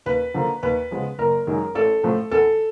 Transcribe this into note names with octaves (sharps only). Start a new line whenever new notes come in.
D#2 B4
D3 F3 A#3
D#2 B4
C#3 F3 G#3 B3
F#1 A#4
F#2 D#3 G#3
A1 A4
A2 F3 A3
E2 A4